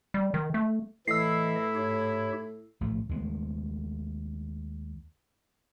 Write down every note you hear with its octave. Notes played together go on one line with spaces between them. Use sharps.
G3
D#3
A3
A2 E3 E4 D#5 E6 C7
G#2 G4 C#5
A#1 A2 A3
D#2 G#3 A3 B3